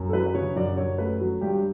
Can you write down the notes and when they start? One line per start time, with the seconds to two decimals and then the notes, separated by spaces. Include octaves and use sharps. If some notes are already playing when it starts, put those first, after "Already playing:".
Already playing: F#2
0.08 A4
0.13 F#3 B4
0.26 B4
0.34 C#3 C#5
0.56 F#2 D5
0.77 F#2 C#5
0.98 A3 B4
1.21 F#3
1.41 G2 G4